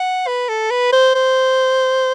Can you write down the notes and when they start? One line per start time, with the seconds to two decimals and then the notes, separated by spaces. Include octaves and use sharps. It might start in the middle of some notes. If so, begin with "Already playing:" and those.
Already playing: F#5
0.27 B4
0.49 A4
0.71 B4
0.92 C5
1.15 C5